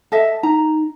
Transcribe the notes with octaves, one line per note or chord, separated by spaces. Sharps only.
A4 D#5 E5
D#4 A#5